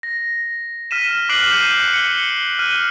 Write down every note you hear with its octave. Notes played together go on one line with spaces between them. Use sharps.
A#6
F6 B6 D#7 E7
D6 F6 F#6 C7 D7 F#7
G6 C#7 D#7
C#7 G7
F6 F#6 D#7